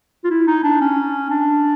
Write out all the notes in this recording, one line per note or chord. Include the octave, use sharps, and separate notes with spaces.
F4
E4
D#4
D4
C#4
D4